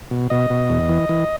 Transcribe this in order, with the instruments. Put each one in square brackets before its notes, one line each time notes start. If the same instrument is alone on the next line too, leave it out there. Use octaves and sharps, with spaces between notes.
[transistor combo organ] B2
B2 D#5
B2
E2
E3
E3